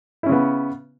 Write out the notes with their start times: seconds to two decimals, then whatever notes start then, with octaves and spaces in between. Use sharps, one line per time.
0.23 E4
0.26 C#4
0.29 C#3
0.32 B3